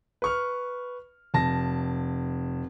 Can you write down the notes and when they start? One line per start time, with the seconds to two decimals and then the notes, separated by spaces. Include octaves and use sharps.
0.22 B4 C#6 F6
1.34 F1 A5 A#6